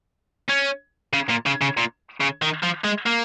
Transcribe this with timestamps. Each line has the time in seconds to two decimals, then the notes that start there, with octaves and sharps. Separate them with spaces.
0.49 C#4
1.13 C#3
1.29 A#2
1.46 C#3
1.62 C#3
1.77 A#2
2.21 C#3
2.42 D#3
2.63 F3
2.85 G#3
3.06 A#3